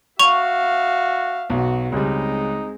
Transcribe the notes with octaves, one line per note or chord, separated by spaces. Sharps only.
F#4 E5 F5 C#6 F7
B1 F#4
C#2 G3 G#3 C4 D#4